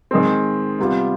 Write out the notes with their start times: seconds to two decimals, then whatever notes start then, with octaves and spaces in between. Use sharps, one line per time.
0.11 D#3 G#3 C4
0.79 C3 G3 B3 F4